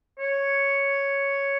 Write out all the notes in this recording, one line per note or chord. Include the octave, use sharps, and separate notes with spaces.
C#5